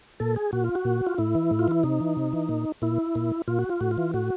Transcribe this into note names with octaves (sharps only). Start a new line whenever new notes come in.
A#2 A4
G#4
A#2 F#4
F4
F#4
A#2
F4
A2 E4
E3
A2
F4
E3 E4
C3 D#4
E3
C3
E3
A#2
A#2 E4
A#2
A#2 F4
F#4
F4
A2 F#4
F4
E3
A2 F#4